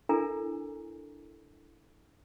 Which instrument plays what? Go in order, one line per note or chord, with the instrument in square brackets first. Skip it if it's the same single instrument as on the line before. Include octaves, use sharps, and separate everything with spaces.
[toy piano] D4 E4 A4 A#4 G#5 A#5